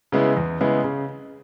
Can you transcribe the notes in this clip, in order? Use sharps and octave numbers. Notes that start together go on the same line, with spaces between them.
C#3 G#3 B3 E4
E2
C#3 G#3 B3 E4
C#3